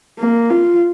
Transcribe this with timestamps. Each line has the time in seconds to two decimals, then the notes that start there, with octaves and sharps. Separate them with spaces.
0.19 A#3
0.51 F4